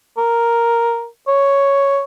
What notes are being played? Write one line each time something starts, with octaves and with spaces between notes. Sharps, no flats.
A#4
C#5